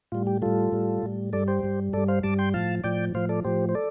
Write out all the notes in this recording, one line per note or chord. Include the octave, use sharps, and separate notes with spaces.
A2 G3 F4
G4
A2 G3 F4 A4
A2 G3
A2 G3
G2 G3 A4 D5
G4 C5
G2 G3
G2 G3 A4 D5
C5 F5
G2 G3 A5 D6
G5 C6
A2 F3 F5 A5
A2 F3 D5 G5
A2 F3 C5 F5
A4 D5
A2 F3 G4 C5
C5
A4 D5